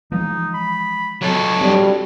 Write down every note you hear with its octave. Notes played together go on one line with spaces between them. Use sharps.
E3 F3 G#3 D#4
B5
F#3 A4 C#5
G3 C4 D4